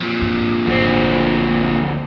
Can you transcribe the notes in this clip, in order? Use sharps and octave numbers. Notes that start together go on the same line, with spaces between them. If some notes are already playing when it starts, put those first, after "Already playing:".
F2 A#2
G#2
G#1 D2 C4